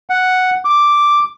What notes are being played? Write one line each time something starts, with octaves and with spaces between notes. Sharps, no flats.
F#5
D6